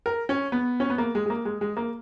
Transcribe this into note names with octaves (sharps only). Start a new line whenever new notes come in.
A#4
C#4
B3
C#4
B3
A#3
G#3
G#3
A#3
G#3
G#3
A#3